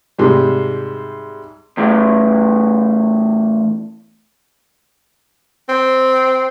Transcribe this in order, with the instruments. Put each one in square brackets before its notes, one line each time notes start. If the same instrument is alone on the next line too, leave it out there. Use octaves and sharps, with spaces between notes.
[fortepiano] G#2 C3 G3
[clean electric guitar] E2 A2
[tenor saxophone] C4